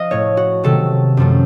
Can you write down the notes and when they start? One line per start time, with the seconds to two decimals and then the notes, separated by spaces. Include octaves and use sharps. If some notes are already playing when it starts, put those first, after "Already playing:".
Already playing: F3 D#5 F5
0.11 A2 A3 C#5
0.37 F#4
0.64 C3 D#3 F#3 A3 A4
1.17 F#2 F3 A3